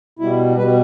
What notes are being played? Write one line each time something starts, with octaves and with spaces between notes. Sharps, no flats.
B2 G3 E4
B2 G3 B4